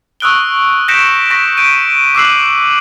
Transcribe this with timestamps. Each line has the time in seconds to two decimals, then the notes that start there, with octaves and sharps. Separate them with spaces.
0.20 C#6 D#6 E6 F#6 D7 G7
0.88 G6 A#6 B6 C#7 D7 E7
1.31 C#6 A#6 B6 E7
1.57 G6 D7 D#7
2.15 D6 E6 F#6 C7 D#7 F#7